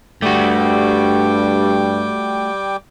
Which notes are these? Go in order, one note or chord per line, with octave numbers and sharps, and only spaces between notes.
G2 G3 A3 F#4 G5 D6